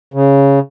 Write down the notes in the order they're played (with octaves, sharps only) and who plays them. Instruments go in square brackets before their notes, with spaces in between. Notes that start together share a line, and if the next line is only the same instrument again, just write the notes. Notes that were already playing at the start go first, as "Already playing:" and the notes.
[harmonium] C#3